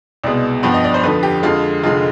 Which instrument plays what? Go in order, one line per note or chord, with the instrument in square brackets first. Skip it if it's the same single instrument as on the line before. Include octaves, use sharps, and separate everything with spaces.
[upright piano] C2 B2 G#3 D5
G2 F3 B3 G5
D#5
D5
C5
F2 D3 F3 B4
G4
F2 D3 G#3 F4
F1 F2 D3 G#3 F4